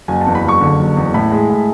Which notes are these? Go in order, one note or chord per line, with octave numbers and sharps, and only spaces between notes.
F#1 G#5
A5
E2
B5
F#1 C#6
D3
F#1
E2
A2 B5
G#3
A2